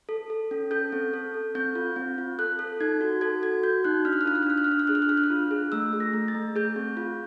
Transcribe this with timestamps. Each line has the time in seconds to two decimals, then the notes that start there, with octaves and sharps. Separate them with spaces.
0.09 A4
0.30 A4
0.51 C#4
0.71 A4 G6
0.92 C4
1.14 A4
1.34 A4
1.55 C4 G6
1.75 F4
1.96 C4
2.18 F4
2.39 A4 F#6
2.59 A4
2.80 D#4 G#6
3.01 F#4
3.21 A4 G#6
3.42 F#4 G#6
3.63 F#4 G6
3.84 D#4 F#6
4.05 D4 F6
4.13 F#6
4.21 F6
4.26 F4 F#6
4.35 F6
4.43 F#6
4.46 D4 F6
4.58 F#6
4.64 F6
4.68 D4 F#6
4.79 F6
4.87 G#4 F#6
4.95 F6
5.02 F#6
5.09 D4 F6
5.17 F#6
5.24 F6
5.30 F4
5.51 G#4
5.72 A3 E6
5.93 G#4
6.00 A#6
6.13 A3
6.28 A6
6.35 A3
6.56 G#4 G6
6.76 C4
6.97 F4